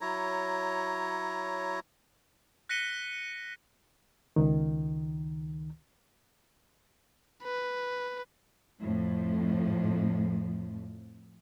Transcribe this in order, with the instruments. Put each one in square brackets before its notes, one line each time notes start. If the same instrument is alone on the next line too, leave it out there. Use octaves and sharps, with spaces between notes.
[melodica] F#3 E4 C#5 A#5
[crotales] F#6 A#6 B6 C#7 D#7 G7
[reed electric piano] C#2 D#3
[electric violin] B4
[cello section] F2 A2 F3